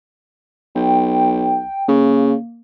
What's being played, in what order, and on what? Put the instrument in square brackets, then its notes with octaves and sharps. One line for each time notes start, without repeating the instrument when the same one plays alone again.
[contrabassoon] B1 [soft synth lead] G5
[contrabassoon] C#3 [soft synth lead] A#3